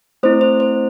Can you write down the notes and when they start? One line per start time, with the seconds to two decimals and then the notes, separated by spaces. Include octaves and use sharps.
0.23 A3 C4 E4 C5
0.41 C5
0.60 C5